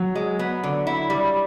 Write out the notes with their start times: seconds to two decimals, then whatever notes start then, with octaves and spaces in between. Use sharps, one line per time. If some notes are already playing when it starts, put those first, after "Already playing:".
Already playing: F#3
0.15 G#3
0.39 B3
0.63 D3
0.87 E4
1.10 G3